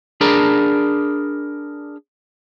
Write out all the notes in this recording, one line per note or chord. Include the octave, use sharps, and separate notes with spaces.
D4 G#4 A#4 D5 A#5 B5